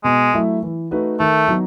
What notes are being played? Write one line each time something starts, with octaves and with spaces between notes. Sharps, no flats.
B2 G#3
F#3 A3 E4
E3
A3 D#4 F#4 B4
D#3 A3
F#3 B3 D#4